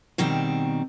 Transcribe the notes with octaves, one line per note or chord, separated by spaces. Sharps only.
B2 D#3 G3 C4